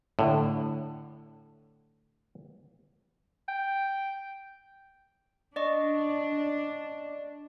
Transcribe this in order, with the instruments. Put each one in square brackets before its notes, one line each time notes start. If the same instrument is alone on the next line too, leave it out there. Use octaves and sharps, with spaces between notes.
[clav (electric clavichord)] A2 D3
[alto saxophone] G5
[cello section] D4 [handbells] D5 D#5 C#6